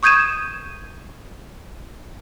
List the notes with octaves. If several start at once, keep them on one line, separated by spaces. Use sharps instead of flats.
C#6 D#6 G6 G#6 D#7 E7